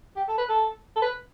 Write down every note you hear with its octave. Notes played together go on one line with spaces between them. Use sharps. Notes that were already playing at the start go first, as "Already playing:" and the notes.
G4
A4
B4
A4
A4
B4